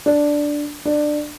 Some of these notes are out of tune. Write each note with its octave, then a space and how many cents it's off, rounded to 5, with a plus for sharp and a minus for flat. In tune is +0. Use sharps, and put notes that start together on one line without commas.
D4 +0
D4 +20